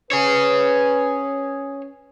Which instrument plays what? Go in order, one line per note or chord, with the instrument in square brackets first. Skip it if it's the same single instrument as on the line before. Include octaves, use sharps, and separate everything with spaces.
[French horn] C#4 [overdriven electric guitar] G#4 C#5 [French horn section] B4